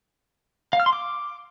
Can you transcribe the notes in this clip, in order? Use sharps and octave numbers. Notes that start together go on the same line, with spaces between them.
F5
F6
C6
D6